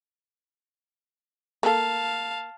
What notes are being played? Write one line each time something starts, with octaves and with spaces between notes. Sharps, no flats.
A#3 A4 F5 A5